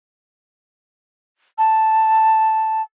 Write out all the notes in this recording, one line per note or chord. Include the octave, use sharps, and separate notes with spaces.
A5